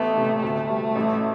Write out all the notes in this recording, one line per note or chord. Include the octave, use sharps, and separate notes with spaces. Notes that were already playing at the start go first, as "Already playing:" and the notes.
Already playing: A1 A3 B3
C3
D2 A3
G3
A1